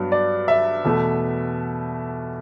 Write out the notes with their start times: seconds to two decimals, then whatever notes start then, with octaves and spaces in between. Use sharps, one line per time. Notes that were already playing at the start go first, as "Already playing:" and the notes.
Already playing: G2 F#3 B3
0.12 D5
0.48 E5
0.84 E2 B2 A3